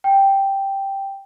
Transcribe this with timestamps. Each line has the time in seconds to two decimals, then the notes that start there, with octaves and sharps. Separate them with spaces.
0.04 G5